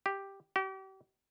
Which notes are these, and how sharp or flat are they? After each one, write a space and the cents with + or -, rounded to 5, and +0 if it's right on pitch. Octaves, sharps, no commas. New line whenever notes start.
G4 +0
G4 -40